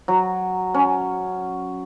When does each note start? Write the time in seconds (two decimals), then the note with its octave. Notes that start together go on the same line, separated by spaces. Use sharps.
0.08 F#3
0.74 C#4